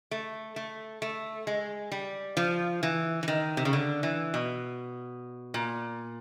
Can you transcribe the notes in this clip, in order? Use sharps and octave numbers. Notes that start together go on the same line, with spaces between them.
A3
A3
A3
G#3
G3
F3
E3
E3
D#3
C3
C#3
D3
E3
B2
A#2